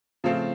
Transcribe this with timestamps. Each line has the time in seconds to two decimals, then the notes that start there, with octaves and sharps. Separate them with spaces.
0.24 C#3 F3 A3 C4 F4